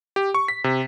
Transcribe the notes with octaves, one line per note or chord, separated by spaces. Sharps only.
G4
C#6
B6
C3